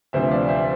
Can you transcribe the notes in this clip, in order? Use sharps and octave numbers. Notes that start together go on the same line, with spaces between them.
D2 C3 F3 B3 C5 E5
D5 F5
C5 E5